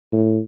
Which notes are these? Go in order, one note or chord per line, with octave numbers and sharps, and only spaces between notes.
A2